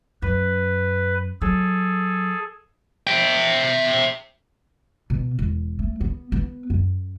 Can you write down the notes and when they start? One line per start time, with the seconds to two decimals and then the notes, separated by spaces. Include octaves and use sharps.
0.22 F#2 B4
1.42 F#3 G#4 A4
3.07 E5 G5
5.10 B2
5.39 E1
5.79 A3
6.01 B3
6.32 B3
6.70 F#2